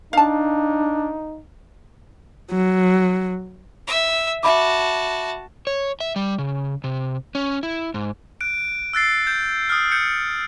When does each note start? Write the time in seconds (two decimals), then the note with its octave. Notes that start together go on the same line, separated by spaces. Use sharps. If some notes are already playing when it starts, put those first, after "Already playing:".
0.13 D4 D#4 F5 A5
2.51 F#3
3.87 E5 E6
4.43 F#4 E5 A5 B5 D6
5.67 C#5
6.00 E5
6.16 G3
6.38 C#3
6.84 C3
7.35 C#4
7.63 E4
7.94 G#2
8.41 F#6 D7
8.93 E6 F#6 A6 C7
9.27 G6
9.69 D#6 F6
9.92 G6 C#7